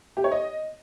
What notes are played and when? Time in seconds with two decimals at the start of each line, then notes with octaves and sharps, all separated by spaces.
0.17 G4
0.24 C#5
0.32 D#5